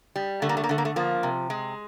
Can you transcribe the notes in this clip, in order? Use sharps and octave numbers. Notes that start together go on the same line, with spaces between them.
G3
D3 A3
A#3
A3
A#3
D3 A3
A#3
A3
F3 A#3
C3
G#3